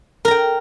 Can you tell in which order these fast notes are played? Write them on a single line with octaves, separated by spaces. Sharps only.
A#4 A#5 G5